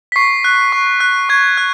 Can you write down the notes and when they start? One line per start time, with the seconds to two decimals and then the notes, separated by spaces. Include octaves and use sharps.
0.12 B6
0.16 C#6 C7
0.44 F#6
0.72 C#6
1.00 F#6
1.29 C#6 G#6
1.58 F#6